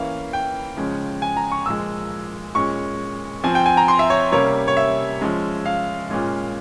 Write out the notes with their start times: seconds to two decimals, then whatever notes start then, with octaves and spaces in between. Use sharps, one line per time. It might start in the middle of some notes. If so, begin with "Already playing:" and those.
Already playing: E3 A#3 C#4 F5
0.33 G5
0.77 C#3 F3 G#3 C#4
1.22 G#5
1.37 A#5
1.52 C#6
1.66 A#2 F3 G#3 E6
2.55 A#2 G#3 C#4 C#6
3.44 F3 C4 G#5
3.55 G5
3.66 G#5
3.77 A#5
3.88 C6
3.99 E5
4.10 C#5
4.32 C3 G3 A#3 C#4 C#5
4.68 C#5
4.77 E5
5.21 F3 G#3 C#4
5.66 F5
6.10 A#2 G#3 C#4